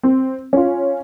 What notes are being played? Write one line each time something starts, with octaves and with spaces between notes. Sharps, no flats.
C4
C#4 F4